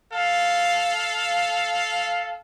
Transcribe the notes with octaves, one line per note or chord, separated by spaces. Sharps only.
A4 F5